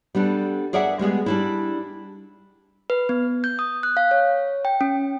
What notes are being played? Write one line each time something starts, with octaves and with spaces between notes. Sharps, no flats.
G3 B3 D4 A4
G#4 A#4 D5 E5 F#5
G3 G#3 B3 G#4
G3 D4 E4
B4
B3
G6
D#6
F#6
F5
C#5
G5
C#4